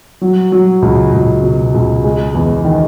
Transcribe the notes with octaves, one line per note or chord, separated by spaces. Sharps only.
F#3
F#3
C#2
C#2
B2
C#2
G#3
E2
D#3